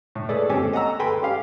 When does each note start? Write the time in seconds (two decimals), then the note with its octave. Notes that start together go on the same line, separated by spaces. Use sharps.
0.15 A2
0.29 G#4 A4 B4 D5
0.50 A3 C4 C#4 G4 A4 G#5
0.73 D#5 F#5 A#5 E6
0.99 A4 B4 G5 G#5 B5 C6
1.22 C#4 G4 F5